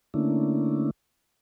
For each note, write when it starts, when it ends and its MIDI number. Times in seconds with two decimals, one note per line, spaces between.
0.14 0.91 50
0.14 0.91 57
0.14 0.91 58
0.14 0.91 61
0.14 0.91 62
0.14 0.91 64